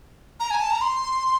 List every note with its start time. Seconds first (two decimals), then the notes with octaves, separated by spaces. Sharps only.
0.40 A#5
0.51 G#5
0.60 A5
0.71 A#5
0.81 C6